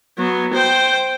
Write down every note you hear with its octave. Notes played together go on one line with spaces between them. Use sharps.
F#3 B3
C5 G5